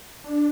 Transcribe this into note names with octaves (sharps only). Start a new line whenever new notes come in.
D4